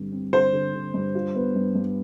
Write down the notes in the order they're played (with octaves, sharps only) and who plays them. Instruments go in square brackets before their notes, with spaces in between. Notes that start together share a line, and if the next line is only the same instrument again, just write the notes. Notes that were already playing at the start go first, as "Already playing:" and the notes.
Already playing: [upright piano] G2 D3 C4
C4
[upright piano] D3 [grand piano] C5
[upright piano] D3
D3
G2
F4
B3
G2
G2